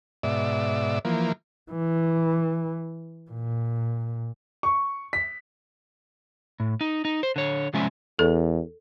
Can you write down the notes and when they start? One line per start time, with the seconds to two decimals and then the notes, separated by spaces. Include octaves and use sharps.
0.23 G#2 B2 D5 E5
1.05 E3 F3 A#3
1.72 E3
3.31 A#2
4.63 C#6
5.13 B6
6.60 A2
6.81 D#4
7.05 D#4
7.23 C5
7.36 D3 C#5
7.74 C3 F3 G#3 C#4 E5 G#5
8.19 E2 A4